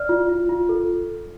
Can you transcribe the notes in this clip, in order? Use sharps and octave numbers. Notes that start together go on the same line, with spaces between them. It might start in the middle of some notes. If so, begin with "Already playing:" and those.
Already playing: D5 F6
F4
F4
F4
A4